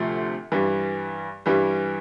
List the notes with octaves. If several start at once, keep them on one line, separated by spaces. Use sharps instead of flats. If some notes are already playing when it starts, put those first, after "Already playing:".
Already playing: D2 C3 F3 A3
G2 E3 G3
G2 E3 G3